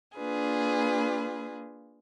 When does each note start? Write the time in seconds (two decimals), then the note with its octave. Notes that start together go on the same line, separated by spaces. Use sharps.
0.17 A#3 D4 F4 G#4 B4